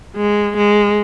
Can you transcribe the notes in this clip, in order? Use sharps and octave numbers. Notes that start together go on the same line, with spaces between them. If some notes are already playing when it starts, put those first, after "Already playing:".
G#3
G#3